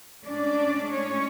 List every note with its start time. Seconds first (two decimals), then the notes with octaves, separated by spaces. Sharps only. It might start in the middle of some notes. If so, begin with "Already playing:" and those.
0.24 A2 G#3 C#4 D4 D5
0.90 C#4 C#5